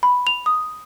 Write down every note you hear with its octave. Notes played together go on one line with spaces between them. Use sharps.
B5
F7
D#6